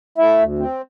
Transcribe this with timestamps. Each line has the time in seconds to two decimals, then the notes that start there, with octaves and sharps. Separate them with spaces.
0.18 A3 E4 E5
0.39 D2
0.59 C4